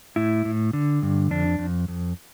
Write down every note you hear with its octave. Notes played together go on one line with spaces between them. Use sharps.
A2 E4
A2
D3
G2
F2 D4
F2
F2